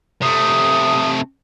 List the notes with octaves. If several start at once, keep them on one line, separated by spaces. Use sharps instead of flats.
C3 A3 D#6